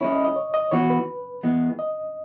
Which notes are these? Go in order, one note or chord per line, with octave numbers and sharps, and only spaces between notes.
G#3 C#4 E4 C#5
D#5
D#5
C#5
D#5
E3 B3 F#4 C#5
B4
E3 G#3 B3
D#5